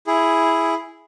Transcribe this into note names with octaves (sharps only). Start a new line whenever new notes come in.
E4 G#4